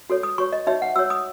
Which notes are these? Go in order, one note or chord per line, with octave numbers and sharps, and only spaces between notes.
F#4 A4 C#5
D#6
F#4 C#5 C#6
D#5
D#4 F#4 C#5 E5
F#5
F#4 C#5 E6
D#6